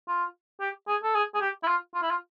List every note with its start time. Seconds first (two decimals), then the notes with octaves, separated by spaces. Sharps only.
0.08 F4
0.61 G4
0.88 G#4
1.03 A4
1.15 G#4
1.35 G#4
1.41 G4
1.63 E4
1.67 F4
1.95 F4
2.02 E4
2.11 F4